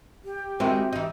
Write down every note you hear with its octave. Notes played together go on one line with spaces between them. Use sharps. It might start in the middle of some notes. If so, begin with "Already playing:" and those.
G4
G#3 C4 E4 F#4 A#4 G5
E3 D#4